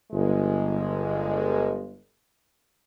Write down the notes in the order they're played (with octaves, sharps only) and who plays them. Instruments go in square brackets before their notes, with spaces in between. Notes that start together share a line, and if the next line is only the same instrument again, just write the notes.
[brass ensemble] G1 G#3